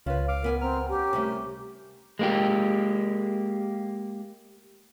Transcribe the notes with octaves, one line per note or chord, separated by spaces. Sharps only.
C#2 C#3 F4 B4
F5 D6
D2 B3 A#4 G#5
C4 A#4 F6
C#4 G4 A#4
C3 G3 A3
G#3 A#3 G4